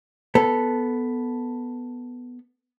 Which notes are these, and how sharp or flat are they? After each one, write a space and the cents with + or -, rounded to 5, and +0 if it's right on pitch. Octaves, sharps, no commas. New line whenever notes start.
B3 +0 A4 +0